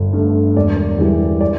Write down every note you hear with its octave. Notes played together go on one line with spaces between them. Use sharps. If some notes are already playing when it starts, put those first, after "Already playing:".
Already playing: G1
G2 D3 A3
E1 D5
E2 E3 G3
D5